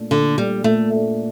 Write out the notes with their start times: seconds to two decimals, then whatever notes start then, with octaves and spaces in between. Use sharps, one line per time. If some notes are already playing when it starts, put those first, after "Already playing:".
Already playing: A#2 A3 D4
0.11 A#2 D3
0.37 G3 A3 D4
0.64 A#2 A3
0.91 A3 D4